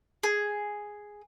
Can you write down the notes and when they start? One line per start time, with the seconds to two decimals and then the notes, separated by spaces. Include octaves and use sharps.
0.23 G#4